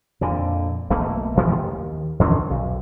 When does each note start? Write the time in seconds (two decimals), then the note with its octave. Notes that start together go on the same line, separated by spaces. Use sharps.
0.21 F2 A#2 D3
0.90 B1 B2 A3 A#3
1.35 B1 F#2 E3 F3
1.52 D#2
2.19 E2 D3 B3 C#4
2.50 B1